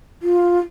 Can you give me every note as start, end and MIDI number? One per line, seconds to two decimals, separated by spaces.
0.22 0.58 65